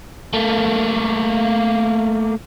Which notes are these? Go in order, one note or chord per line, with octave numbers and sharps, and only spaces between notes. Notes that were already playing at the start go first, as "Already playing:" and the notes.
A3 A#3